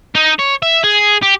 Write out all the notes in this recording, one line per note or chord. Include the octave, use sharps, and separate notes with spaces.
D#4
C#5
E5
G#4
G4